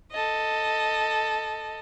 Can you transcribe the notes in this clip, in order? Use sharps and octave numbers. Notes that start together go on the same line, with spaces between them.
A4 D#5